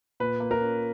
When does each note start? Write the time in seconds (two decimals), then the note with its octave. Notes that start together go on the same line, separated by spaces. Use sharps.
0.20 A#2 B4
0.40 A#3
0.51 A#4
0.61 C#4